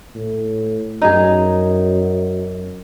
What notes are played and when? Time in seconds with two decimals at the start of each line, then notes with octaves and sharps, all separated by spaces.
0.15 A2
1.02 F#2 D#4 G#4